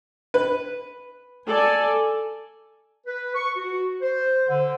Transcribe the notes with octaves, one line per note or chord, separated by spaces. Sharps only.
B4
A4 D5 G#5
B4
C#6
F#4
C5
D3